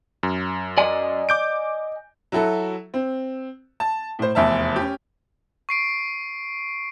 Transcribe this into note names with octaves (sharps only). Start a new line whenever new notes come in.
F#2
D5 D#5 G#5
D6 G6 D7
F#3 E4 F#4 A4
C4
A5
A2 C5
F1 E2 E5 A5
C#4 G4
C#6 C7 D7